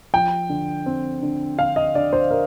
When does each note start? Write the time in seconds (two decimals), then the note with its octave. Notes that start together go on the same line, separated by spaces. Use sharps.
0.13 F3 G5
0.49 D3
0.86 C4
1.22 D3
1.58 D3 F5
1.76 D#5
1.95 D3 D5
2.13 C5
2.31 A#4